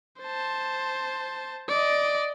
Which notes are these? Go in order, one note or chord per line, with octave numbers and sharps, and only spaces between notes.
C5 A5
D5 D#5